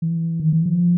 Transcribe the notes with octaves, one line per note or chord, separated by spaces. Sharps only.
E3
D#3
E3
F3